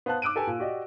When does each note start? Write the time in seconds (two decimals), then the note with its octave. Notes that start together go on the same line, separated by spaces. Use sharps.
0.06 B3 C5 F5 A5 F#6
0.22 D6 E6 F#6 D7 D#7
0.36 G4 A4 B4 G#5
0.47 A#2
0.59 F#4 G4 D5 D#5